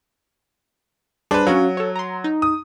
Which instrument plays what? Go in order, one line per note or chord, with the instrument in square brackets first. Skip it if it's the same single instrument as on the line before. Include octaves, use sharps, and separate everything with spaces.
[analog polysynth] G3 G#4 C5 [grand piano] D4 B4
[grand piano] F#3 [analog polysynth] C#4 F#4 F5
[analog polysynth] A4 C#5
A#5 C6
D#4
[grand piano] D#6